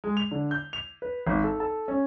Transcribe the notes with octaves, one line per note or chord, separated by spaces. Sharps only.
G#3
F7
D3
G6
F7
B4
G#1
A4
A4
C#4